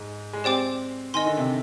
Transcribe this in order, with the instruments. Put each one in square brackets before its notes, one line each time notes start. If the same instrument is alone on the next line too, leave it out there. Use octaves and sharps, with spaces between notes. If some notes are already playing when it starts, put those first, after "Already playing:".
Already playing: [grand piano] G#2
G#3
[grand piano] C4 [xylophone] G4 D5 G5 D6
[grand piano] D#3 [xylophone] D#5 G#5 C6
[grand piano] D3
C3